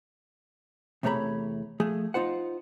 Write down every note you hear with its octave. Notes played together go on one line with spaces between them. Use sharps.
E2 C3 A3 C#5 A#5 B5
F3 A3 G#4
D#4 F4 C5 F#5